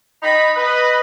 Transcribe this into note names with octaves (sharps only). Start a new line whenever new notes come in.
D#4 B5
B4 D#5